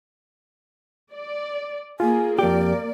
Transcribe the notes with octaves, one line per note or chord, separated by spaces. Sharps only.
D5
A#3 F4 G#4 G#5
F2 A#3 G4 D5